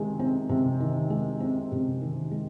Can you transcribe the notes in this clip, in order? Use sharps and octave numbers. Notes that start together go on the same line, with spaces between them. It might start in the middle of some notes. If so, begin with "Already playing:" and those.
Already playing: C3 D#3 G#3
C4
C3
D#3
G#3
C4
C3
D#3
G#3